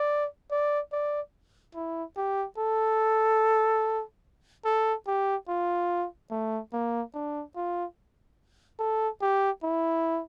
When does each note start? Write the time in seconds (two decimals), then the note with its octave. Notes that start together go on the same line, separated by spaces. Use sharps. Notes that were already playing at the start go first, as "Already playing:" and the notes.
Already playing: D5
0.51 D5
0.92 D5
1.75 E4
2.17 G4
2.58 A4
4.65 A4
5.07 G4
5.48 F4
6.31 A3
6.73 A#3
7.14 D4
7.56 F4
8.80 A4
9.22 G4
9.63 E4